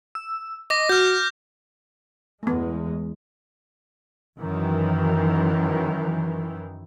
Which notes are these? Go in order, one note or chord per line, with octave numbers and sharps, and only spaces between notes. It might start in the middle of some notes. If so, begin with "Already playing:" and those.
E6
D#5 D6 A#6
F#4 F6 G6
E2 G#3 A3 B3
F#2 D#3 E3